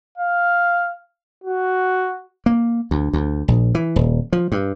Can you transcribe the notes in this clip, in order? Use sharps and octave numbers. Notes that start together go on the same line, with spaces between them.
F5
F#4
A#3
D2
D2
A#1
E3
D#1
F3
G2